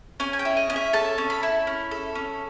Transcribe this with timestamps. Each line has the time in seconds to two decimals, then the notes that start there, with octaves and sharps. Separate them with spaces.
0.20 C#4 G#5
0.33 G#5
0.39 G5
0.45 E4
0.57 D#5
0.70 C#4
0.76 E5
0.93 A4 A5
1.18 C#4
1.30 B5
1.43 E4
1.67 C#4
1.91 A4
2.15 C#4